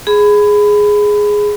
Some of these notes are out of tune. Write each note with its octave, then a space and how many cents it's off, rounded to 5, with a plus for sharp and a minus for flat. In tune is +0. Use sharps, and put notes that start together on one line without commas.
G#4 +0 B5 +20